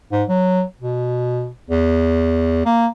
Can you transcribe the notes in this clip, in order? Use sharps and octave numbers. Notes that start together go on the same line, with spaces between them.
G#2
F#3
B2
E2
A#3